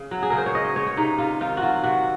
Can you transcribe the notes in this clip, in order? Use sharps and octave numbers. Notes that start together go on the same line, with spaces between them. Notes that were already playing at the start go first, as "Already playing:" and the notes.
Already playing: C#3
F#3
G#4
C#3 A#4
C5
C#5
F#3 D#5
D#5
C#3 C#5
C#5
C3 D#4
C3 F4
D#3 F4
F#4
F#3 F4
C3 F#4